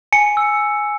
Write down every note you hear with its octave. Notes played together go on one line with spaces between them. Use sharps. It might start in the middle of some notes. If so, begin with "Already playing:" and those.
G#5 C#7
E6